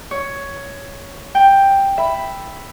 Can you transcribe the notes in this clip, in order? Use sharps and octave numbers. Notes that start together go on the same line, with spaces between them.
C#5
G5
E5 B5